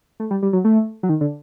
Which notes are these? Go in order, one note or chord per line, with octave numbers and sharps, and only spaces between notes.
A3
G3
G3
F#3
A3
F#3
D#3
D3